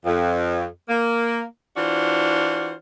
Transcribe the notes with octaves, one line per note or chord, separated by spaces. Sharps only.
F2
A#3
E3 D4 F4 F#4 C5